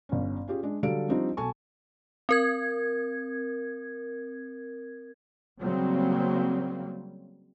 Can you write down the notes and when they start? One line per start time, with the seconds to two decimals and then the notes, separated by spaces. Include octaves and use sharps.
0.09 G1 C#4
0.48 C#4 F4 G4 G#4
0.63 G#3 D4
0.83 D3 F#3 G3 A4 F5 D7
1.09 F3 G3 C4 D4 D#4 F4
1.37 B1 A4 G#5 A5 C#6
2.29 C4 A#4 G#6
5.60 C#3 F#3 G3 A#3 C4